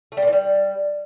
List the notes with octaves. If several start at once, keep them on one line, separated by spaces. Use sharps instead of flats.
A3
G3
A#2
E3
G3